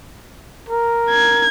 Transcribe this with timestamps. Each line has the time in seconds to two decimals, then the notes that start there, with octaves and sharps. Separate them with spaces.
0.69 A#4
1.10 G#6